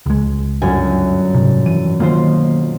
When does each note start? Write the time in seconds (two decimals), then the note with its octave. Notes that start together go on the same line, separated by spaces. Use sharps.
0.06 C#2 G#3
0.62 G1 F#2 G#5
1.35 G#2 C3
1.66 E3 D#7
2.00 B1 D#3 F#3 A#3 F4 C5